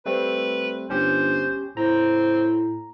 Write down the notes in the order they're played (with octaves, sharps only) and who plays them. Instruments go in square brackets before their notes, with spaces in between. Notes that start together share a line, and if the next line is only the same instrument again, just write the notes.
[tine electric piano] G3 A3 C4 [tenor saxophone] B4
[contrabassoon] G1 [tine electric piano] C#4 G4 [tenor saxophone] C5
[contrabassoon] A2 [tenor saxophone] C4 [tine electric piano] A#5